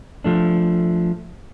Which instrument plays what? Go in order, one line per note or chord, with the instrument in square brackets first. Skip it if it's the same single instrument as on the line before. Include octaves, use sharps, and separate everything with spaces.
[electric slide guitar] F3 A3 D4